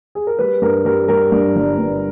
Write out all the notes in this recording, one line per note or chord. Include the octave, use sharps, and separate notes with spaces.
G#4
A#4
G3 B4
G2 A#4
G3 A#4
G3 A#4
G2
G1
G2